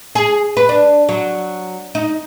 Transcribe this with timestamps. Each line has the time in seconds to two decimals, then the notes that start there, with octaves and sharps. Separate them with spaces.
0.15 G#4
0.57 B4
0.69 D4
1.09 F#3
1.95 D#4